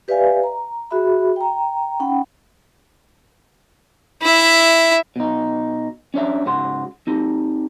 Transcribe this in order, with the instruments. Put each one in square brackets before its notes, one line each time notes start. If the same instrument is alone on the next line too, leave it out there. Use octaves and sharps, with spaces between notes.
[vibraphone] G4 B4 D5 E5 F5 G#5
A#5
F#4 G#4 E5 B5
G5 A#5
C#4 D#4 F#5 G5 B5
[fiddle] E4 E5
[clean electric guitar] B2 D#4
C#4 D4 C#5 E5
G#2 C#3 F#4 C6
C4 D#4 G4